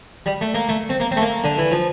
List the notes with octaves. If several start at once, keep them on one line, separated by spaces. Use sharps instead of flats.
G3
A3
A#3
A3
C4
A#3
C4
A3
A#3
D3
E3
F3